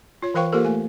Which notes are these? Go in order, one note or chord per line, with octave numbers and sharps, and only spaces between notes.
F4 C#5
E3 A#4 C5 F5 G5 C#6
A#3 F4 G4 A4 A#4 C5
A3 G#5